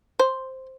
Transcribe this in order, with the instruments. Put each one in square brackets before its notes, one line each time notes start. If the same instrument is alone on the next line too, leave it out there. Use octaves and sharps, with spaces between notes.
[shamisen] C5